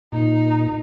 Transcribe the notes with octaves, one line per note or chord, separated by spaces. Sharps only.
A#2 D#4